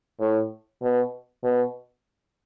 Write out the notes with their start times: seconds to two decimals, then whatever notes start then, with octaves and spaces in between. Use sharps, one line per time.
0.20 A2
0.82 B2
1.44 B2